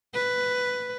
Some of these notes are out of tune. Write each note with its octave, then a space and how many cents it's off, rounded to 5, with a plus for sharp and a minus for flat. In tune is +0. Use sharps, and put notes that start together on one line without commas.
B4 +5